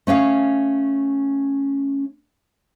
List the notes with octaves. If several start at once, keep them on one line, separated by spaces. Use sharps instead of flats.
A3 C#4 C#5 F5